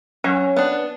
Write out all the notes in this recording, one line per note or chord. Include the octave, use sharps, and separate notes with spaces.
F#3 C#4
B3 D4